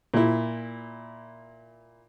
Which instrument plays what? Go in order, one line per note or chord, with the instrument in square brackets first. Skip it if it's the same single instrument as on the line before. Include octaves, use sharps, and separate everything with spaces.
[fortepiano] A#2 E4